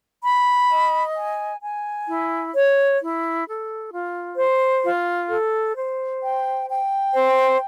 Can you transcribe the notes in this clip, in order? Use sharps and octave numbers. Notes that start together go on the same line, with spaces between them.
B5
D#5
G#5
G#5
E4
C#5
E4
A4
F4
C5
F4
A4
C5
G5
G5
C5